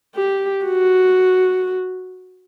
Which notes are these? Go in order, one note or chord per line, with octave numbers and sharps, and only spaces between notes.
G4
F#4